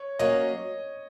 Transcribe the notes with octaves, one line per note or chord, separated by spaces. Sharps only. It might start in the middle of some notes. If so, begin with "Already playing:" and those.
Already playing: C#5
F#3 A#3 C#4 D#5